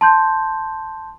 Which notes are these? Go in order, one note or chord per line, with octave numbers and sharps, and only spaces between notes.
A5 C6 G6